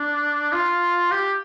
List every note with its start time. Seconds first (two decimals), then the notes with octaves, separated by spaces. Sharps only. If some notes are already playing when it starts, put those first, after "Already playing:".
Already playing: D4
0.53 F4
1.12 G4